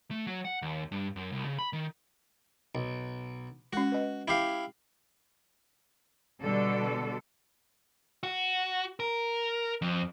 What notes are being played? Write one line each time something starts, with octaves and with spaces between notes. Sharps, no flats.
A3
F#3
F#5
D#2
G2
F#2
C2
C#3
B5
D#3
B1
G#3 C#4 F#4
B4 D#5
E4 G4 F5
B2 D3 G3 A4
F#4
A#4
F2